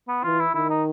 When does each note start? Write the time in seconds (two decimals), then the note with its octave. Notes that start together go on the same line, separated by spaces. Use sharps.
0.08 B3
0.24 E3 F4
0.40 E4
0.55 D#3 E4
0.70 D#4